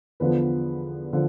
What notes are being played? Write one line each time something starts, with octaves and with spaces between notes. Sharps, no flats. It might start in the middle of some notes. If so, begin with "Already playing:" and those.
E2 D3 F3 B3 B4
D3 F3